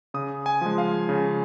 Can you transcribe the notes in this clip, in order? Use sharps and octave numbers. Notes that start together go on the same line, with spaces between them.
C#3 D#6
G#5
F3 G#3
F5
C#3